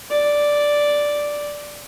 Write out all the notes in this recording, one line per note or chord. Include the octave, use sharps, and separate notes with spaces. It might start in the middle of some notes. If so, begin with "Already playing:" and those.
D5